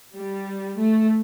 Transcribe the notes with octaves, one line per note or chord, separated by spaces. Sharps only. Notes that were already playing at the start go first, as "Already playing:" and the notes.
G3
A3